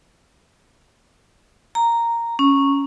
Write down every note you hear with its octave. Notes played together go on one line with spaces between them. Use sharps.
A#5
C#4